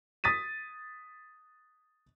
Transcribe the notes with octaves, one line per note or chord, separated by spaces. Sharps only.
D#6 A6 B6 D#7